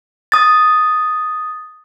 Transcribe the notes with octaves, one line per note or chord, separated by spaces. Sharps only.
D#6 A6